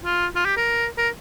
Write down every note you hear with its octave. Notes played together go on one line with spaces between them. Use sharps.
F4
F4
G4
A#4
A#4